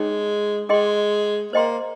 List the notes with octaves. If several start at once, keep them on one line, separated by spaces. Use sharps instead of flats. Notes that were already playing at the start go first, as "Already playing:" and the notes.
Already playing: G#3 D#4 G#4 C#5 G5
G#3 G#4 D#5 G5 C6
A#3 C5 D#5 G5 C6